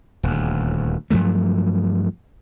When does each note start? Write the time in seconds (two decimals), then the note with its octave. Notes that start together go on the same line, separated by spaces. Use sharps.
0.23 D#1 D2
1.10 G2 F3 F#3 A3